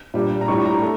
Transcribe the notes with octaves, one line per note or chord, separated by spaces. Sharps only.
A#2 G3 D4
A#5
A2 G3 D4 C#6
A#5
A3